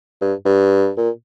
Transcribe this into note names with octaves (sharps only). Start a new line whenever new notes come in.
G2
G2
A#2